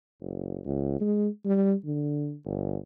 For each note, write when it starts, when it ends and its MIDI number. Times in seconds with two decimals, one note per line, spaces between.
0.21 0.59 30
0.66 0.99 37
1.01 1.28 56
1.45 1.73 55
1.85 2.34 50
2.45 2.77 31